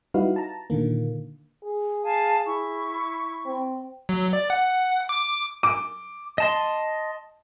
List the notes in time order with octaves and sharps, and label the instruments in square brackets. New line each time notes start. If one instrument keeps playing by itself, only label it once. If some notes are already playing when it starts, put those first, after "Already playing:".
[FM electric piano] G3 D#4 E4 F#4 B4 F5
A5 A#5
A#2 D3 D#3 A#3
[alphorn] G#4
[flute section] F5 G#5 A5
E4 C#6
[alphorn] C4
[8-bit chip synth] F#3
D5
F#5
D6
[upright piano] D6
[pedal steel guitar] D#5 A5 C6